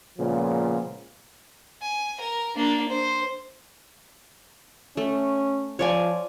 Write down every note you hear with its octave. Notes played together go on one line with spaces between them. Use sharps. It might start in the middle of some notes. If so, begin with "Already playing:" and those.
A#2 C#3 F3 G#3 B3
G#5
A#4
A#3 D4
C5
A3 C#4
F3 C#5 D5 G#5